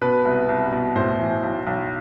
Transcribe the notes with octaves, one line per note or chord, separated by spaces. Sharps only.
B2 B4
C2
C2
B2
A2 C5
E3
B1
B1